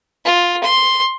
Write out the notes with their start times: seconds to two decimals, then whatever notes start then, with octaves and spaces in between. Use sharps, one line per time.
0.25 F4
0.64 C6